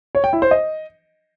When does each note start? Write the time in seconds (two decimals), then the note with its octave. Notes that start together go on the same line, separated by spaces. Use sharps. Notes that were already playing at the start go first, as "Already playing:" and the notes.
0.15 C#5
0.24 G5
0.33 E4
0.42 C5
0.51 D#5